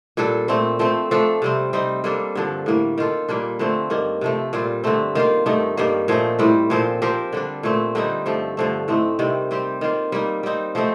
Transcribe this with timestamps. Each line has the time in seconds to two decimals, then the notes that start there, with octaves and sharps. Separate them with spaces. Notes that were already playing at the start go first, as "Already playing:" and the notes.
0.17 A#2 G3 D4 A4
0.48 A#2 A3 C4
0.79 F3 A3 C4
1.11 F3 A3 D4 A4
1.42 C3 G3 C4
1.73 G3 C4 D#4
2.04 G3 A#3 D4 A4
2.35 G2 D3 F3
2.66 A2 G3 A#3
2.98 D#3 A#3 F4 A4
3.28 A#2 G3 A#3 D4
3.59 D3 F3 A3 C4
3.90 G2 D#3 A#3
4.21 C3 F3 A3
4.53 A#2 G3 C4 F4
4.84 G2 D3 A3 C4
5.15 D#3 A#3 F4
5.46 G2 D#3 A3 D#4
5.77 G2 D#3 G3 A#3
6.08 A#2 F3 A3 D#4
6.39 A2 G3 C4
6.70 A#2 F3 C4
7.02 F3 C4 G4 A#4
7.32 D3 G3 D4
7.63 A#2 A3 C4
7.95 D3 G3 C4 D#4
8.26 G2 F3 A3
8.57 G2 D3 F3 A3
8.88 A2 A3 C4 D#4
9.19 C3 D#3 G3 C4
9.51 G3 C4 G4
9.81 D#3 A#3 F4
10.12 G3 A#3 D#4
10.43 G3 C4 D#4
10.75 F3 A3 C4 D#4